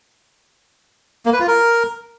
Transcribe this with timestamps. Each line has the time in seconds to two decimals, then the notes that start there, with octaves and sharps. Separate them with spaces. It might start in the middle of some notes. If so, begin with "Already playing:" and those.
1.26 A#3
1.33 B4
1.40 F4
1.47 A#4